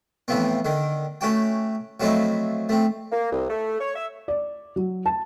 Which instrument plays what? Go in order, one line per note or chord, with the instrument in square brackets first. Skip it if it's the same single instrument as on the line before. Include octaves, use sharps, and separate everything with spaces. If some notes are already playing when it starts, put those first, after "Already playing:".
[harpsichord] A2 E3 F3 B3 C4
D3 D#3
A3 C#4 F#4 G5
F3 F#3 A3 C4 D#4 E4
A3 C4
[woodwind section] A#3
C2
A3
C#5
E5
[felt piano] D5
F#3
A5